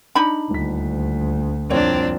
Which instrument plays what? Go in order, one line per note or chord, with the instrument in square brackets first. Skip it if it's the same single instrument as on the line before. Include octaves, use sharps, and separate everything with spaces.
[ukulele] D4 D#4 B5
[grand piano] D#1 B6 [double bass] D2
[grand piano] C2 F2 A#2 [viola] C4 D4 [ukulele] C#5